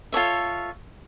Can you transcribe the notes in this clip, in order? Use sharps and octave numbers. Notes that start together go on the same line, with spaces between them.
F4 A4 C#5 E5